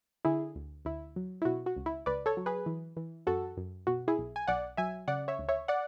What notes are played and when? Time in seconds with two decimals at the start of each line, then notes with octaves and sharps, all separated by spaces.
0.25 D3 E4 G#4
0.56 D2
0.85 D2 E4
1.16 F#3
1.42 E4
1.45 B2 F#4
1.66 F#4
1.76 C#2
1.86 E4
2.06 C#2 B4 D5
2.26 A4 C#5
2.37 F#3
2.46 G#4 B4
2.66 E3
2.97 E3
3.27 F#2 F#4 A4
3.57 F#2
3.87 B2 F#4
4.08 E4 G#4
4.18 B1
4.36 G#5
4.47 B1 D5 F#5
4.77 F#3 E5 G#5
5.08 C#3 D5 F#5
5.28 C#5 E5
5.39 D2
5.49 C#5 E5
5.68 D5 F#5